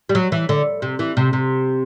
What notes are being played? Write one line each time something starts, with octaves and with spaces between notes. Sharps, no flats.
G3
F#3
E3
D3
C3
E3
C3
C3